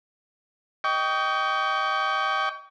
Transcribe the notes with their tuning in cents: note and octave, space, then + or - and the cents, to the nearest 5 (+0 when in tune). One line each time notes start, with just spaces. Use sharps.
D#5 +0 G5 -5 C#6 +35